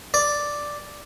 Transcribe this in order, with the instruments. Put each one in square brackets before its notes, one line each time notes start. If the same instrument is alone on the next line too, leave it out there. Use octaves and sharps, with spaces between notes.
[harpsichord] D5